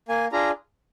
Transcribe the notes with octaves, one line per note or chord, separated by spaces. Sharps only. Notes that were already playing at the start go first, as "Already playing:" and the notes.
A#3 G#5
D4 F4 G#4 A#5